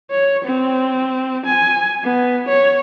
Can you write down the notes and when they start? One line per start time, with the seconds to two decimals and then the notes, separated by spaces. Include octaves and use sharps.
0.11 C#5
0.45 C4
1.46 G#5
2.04 B3
2.48 C#5